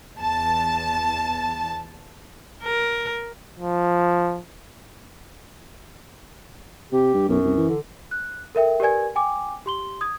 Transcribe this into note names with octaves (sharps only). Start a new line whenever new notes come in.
E2 A5
A#4
F3
C3 G4
G2
B1 F#2
C2
E3
D3
F#6
A4 A#4 E5 G5
G4 A#4 B4 D5 G#5 G#6
G5 G#5 D6
G4 C6 G7
D#6 G#6